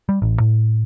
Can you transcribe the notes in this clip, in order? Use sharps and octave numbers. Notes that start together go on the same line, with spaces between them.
G3
A1
A2